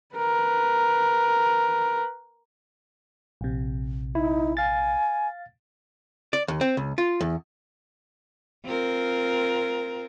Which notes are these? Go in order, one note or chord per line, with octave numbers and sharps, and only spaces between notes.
A#4 B4
A#1 C3
D#4 E4
F5 G#5 A6
D5
D#2
C4
C#2
F4
E2
C4 F4 A#4